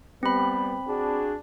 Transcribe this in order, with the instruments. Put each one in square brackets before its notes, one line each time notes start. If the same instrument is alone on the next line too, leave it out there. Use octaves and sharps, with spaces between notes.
[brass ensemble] G3 B3 [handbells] C4 B5
[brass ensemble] D4 F#4 G#4